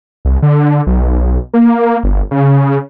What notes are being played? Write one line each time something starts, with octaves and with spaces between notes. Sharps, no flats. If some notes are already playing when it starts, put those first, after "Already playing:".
C2
D3
B1
A#3
G1
C#3